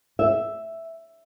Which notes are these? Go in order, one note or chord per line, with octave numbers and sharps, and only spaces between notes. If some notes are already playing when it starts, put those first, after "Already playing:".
E5